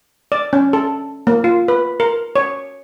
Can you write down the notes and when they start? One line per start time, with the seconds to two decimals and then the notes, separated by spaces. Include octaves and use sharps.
0.32 D5
0.53 C#4
0.73 A4
1.27 A#3
1.44 F4
1.68 B4
2.00 A#4
2.36 C#5